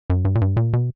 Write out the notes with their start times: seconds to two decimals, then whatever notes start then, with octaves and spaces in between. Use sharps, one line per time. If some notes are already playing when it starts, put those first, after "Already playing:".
0.10 F#2
0.25 G2
0.35 A#2
0.41 G2
0.57 A#2
0.73 B2